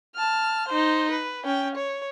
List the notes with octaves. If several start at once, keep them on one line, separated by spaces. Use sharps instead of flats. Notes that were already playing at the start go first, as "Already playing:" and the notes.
A5 F6
D#4 C5
B4
C#4 G5
C#5